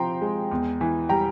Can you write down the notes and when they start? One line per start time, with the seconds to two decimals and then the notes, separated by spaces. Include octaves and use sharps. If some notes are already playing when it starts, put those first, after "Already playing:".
Already playing: C3 F3 G5 A#5 C6
0.22 G#3
0.52 E2
0.81 E3
1.09 G3 G5 A#5